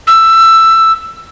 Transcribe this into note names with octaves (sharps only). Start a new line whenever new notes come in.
E6